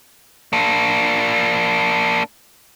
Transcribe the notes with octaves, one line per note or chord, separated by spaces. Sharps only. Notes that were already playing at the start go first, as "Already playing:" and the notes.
A#3 D4